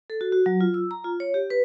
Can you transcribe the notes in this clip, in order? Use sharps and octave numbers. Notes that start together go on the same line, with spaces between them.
A4
F#4
F#4
F#3
F4
E6
A#5
F4
C#5
G4
B4